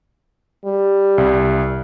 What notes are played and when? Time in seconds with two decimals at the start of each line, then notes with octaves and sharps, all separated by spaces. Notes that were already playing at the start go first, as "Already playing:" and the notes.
0.65 G3
1.18 C2